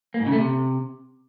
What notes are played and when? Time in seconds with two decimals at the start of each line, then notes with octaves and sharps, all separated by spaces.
0.14 A#3
0.20 G#2
0.26 C#3
0.32 A3
0.38 C3